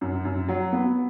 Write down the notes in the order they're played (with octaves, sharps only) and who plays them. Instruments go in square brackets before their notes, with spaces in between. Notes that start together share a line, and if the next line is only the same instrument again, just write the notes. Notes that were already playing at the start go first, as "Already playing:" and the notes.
[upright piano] F#2
F#2
F#3
B3